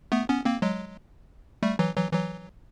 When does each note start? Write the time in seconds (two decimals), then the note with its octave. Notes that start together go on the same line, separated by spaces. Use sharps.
0.12 A3 B3
0.29 B3 C#4
0.45 A#3 C4
0.62 F#3 G#3
1.63 G3 A3
1.79 E3 F#3
1.96 E3 F#3
2.13 E3 F#3